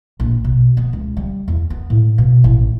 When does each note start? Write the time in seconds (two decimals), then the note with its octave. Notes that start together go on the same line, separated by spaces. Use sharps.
0.20 A#1
0.44 B2
0.77 B3
0.93 C#2
1.17 G3
1.48 E2
1.70 B3
1.90 A2
2.18 B2
2.44 A1